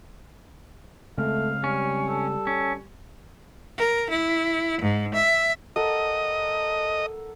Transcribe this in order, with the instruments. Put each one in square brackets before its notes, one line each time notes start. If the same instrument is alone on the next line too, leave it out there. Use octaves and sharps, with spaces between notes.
[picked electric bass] C#3 G#3 C4 [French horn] A3 [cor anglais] F5
[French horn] G3 [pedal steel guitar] C#4
[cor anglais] A4
[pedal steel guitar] C#4
[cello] A#4
E4
G#2
E5
[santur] A4 A#4 F#5 [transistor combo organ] D#5